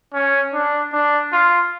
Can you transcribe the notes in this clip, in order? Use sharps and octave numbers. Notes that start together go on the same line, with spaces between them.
C#4
D4
D4
F4